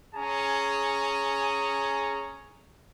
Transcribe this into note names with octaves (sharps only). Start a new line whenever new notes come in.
C#4 G#4 G#5 A#5